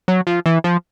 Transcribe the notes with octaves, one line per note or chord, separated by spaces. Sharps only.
F#3
F3
E3
F3